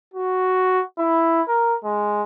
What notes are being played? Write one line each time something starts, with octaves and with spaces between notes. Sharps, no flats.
F#4
E4
A#4
G#3